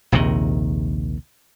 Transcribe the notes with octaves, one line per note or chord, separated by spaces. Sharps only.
A#1 D#2 C3 D#3